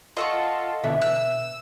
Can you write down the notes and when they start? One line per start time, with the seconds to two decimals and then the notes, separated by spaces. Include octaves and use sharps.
0.17 F4 A4 D#5 F#5 C#6
0.83 B2 D3 E3 B3 E5
1.02 E6 F#6